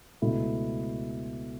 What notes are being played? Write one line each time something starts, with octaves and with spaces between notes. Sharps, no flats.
C#2 B2 A3 E4